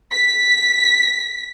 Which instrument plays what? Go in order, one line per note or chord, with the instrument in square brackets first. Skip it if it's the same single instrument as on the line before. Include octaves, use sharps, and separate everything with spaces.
[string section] B6